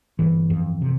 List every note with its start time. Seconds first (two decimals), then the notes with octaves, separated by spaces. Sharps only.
0.19 G1 E3
0.50 F2
0.82 C3